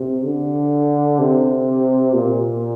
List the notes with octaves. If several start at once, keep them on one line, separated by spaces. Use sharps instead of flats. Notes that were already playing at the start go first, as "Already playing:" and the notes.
Already playing: C3
D3
C3
A#2